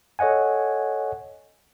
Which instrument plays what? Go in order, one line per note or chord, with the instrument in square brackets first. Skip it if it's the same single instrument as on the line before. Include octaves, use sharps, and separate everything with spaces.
[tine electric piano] A4 C#5 D#5 F#5 G#5